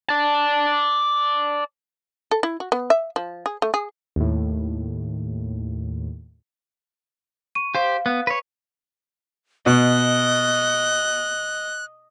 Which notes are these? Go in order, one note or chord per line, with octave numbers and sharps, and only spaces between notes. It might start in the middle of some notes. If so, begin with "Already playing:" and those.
D5 A5
A4
E4
F#4
B3
E5
F3
G#4
A3
G#4
D#2 A2
C#6 D#7
G4 C5 F5
B3
B4 C#5
B2 D#5 F#6